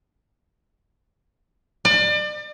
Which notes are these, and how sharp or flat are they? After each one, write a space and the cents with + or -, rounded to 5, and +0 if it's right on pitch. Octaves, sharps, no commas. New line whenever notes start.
D5 +35